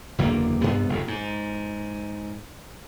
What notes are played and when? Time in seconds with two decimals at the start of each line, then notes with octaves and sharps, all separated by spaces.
0.18 F#1 E2 D3 A#3
0.62 C2 G2 B3
0.89 F1 D#2
1.08 G#2